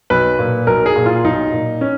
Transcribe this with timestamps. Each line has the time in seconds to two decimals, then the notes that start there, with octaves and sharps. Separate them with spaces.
0.10 B1 B4
0.39 A#2
0.67 B1 A#4
0.86 G#4
0.96 A#2
1.06 F4
1.24 B1 D#4
1.53 A#2
1.81 C#4